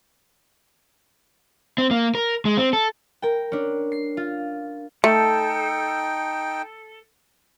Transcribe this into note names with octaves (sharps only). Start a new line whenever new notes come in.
C4
A#3
A#4
G#3
C4
A4
A#4 G5
C#4 D4
C7
F4
A3 D#4 A4 G5